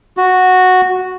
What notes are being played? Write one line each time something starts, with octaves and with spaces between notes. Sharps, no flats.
F#4